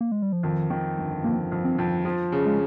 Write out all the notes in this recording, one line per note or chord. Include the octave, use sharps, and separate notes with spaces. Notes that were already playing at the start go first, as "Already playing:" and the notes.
A#3
G#3
G3
F3
F2 D#3
D#3
G1
F2 A#3
F2
C4
F2
F3
C#3
G#3